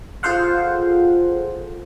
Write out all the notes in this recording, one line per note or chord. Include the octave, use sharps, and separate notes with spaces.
F4 G#4 A4 C5 F5 F#5